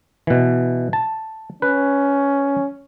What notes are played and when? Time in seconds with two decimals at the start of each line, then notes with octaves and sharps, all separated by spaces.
0.27 B2 E3
0.93 A5
1.62 C#4 B4